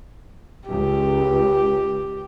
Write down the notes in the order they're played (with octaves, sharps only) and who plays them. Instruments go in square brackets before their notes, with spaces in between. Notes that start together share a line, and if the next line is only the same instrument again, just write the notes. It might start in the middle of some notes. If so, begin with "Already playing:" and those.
[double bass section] C#2 [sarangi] G4